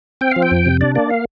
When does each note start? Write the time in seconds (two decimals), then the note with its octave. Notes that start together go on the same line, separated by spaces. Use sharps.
0.21 C4 G5
0.31 F3 F5
0.42 G5
0.51 F2
0.66 C3
0.81 D4 D5
0.95 A#3 D5
1.10 F5